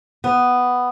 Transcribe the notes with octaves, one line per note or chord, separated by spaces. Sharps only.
B3